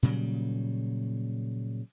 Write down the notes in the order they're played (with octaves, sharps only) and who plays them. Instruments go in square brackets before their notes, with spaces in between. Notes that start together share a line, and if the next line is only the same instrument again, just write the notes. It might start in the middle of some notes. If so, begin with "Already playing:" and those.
[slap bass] A#2 C#3 F#3 G3